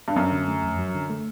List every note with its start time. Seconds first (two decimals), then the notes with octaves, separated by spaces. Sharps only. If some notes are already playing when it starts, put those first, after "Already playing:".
0.08 G2
0.16 F#2 F#3
0.32 D3
0.48 A3
0.64 F2
0.79 F#3
0.94 D3
1.10 A3